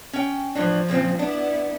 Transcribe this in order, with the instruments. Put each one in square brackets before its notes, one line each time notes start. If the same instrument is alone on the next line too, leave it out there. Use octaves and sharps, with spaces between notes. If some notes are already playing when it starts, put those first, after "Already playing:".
[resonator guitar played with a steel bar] C#4 G5
[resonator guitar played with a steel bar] A2 E3 D4 [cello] F3
[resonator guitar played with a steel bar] A#2 C#3 C4
[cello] B3 E4 [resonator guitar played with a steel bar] D4